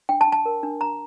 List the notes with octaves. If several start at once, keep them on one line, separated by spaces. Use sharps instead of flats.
D4 G5
A5
D4
A5
A#4
D4
D4 A#5